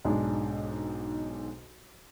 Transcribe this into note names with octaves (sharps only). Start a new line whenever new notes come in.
B1 G#2 G#3 D4